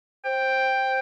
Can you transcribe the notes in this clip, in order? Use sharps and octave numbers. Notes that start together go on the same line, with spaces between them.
C5 G5